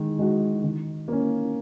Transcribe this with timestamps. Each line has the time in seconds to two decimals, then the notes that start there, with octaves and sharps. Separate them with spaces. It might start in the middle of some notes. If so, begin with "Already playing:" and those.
Already playing: D#3 G#3
0.19 G#3 D#4 F#4
0.63 D#3
1.08 A#3 C#4